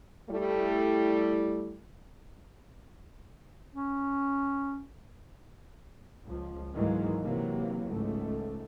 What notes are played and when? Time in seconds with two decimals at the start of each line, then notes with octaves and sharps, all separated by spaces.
0.30 G3 A3 E4
3.75 C#4
6.26 C#2 F3
6.72 G#2 D#3 E3 F#3 G#3 A#3
7.23 C3 E3 F#3 A#3
7.88 C#2 G#2 A3